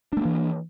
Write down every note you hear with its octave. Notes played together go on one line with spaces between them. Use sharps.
E3 A3 A#3 D4